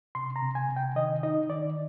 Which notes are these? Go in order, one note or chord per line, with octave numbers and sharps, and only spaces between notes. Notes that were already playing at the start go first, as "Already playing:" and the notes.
C3 C6
A#5
C3
G#5
C3
G5
D#3 D#5
D#4 D#5
D#3 D5